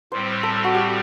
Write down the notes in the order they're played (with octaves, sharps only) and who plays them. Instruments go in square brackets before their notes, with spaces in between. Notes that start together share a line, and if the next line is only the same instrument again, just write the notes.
[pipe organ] A2 G3 C4 [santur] C5
[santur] A4
F#4
G4